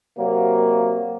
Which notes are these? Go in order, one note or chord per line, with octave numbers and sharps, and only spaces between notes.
C3 F#3 A#3